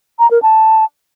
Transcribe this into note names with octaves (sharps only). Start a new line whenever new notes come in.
A#5
A#4
A5